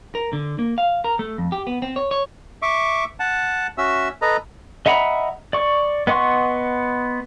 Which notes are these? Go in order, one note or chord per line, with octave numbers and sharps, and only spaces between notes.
A#4
D3
A#3
F5
A#4
A3
F2
G4
B3
C4
C#5
C#5
E5 C#6 D6
F#5 A5
C#4 F#4 E5 E6
A4 B4 D#5 A#5
D#5 E5 F#5 A#5 B5
D5 C#6
B3 D#5 F#5 C6 C#6